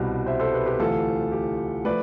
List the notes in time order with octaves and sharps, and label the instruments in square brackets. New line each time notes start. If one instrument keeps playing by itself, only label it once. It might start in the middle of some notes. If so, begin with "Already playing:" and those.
Already playing: [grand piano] C2 B2 G3
C5 E5
A4 C5
G4 B4
G4 B4
D2 C3 E3 F4 A4
G4
F3 A3 B4 D5